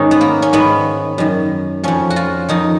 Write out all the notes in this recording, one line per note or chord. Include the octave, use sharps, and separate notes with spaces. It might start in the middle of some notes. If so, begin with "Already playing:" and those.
Already playing: G#2 D#3 C#4 D#4
B3
A#3
C#4
G#2 D#3 B3
F#2 D#3
F2 F3 C#4
F#4
F4
F2 D#3 D#4